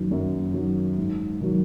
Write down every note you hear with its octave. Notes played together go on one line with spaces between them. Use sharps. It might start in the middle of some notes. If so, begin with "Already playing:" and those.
Already playing: F#2 D#3 F#3
F#2
D#3 F#3
G#2
D#3 F#3